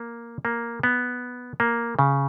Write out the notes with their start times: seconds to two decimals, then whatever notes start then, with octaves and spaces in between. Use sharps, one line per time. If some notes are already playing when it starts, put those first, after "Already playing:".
Already playing: A#3
0.45 A#3
0.83 B3
1.60 A#3
1.99 C#3